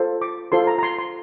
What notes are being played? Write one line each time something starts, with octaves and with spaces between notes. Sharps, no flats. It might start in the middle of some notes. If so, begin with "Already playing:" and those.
Already playing: F4 A4 C5
D6
F4 A4 C5 C6
A#5
A#5
C6
C6